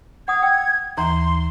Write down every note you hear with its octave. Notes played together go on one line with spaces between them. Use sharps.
F#5 D#6 G#6
G5 E6
D#2 E3 A#5 C6